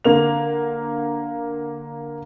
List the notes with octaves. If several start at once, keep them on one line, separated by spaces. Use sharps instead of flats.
D3 A#3 F7